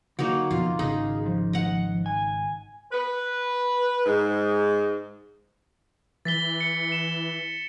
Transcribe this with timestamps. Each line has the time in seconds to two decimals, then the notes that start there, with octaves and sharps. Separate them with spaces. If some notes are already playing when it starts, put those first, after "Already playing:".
0.19 D3 F#3 A#3 D#4
0.51 F2 B2 F4
0.79 G#1 C#3 D#4 G#4
1.26 F3
1.53 D#5 F#5
2.06 G#5
2.91 B4
4.06 G#2
6.25 E3 A6 B6 G7
6.61 C#7
6.92 E7